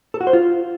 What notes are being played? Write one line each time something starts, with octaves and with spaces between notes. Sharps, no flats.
A4
F#4
C5
F4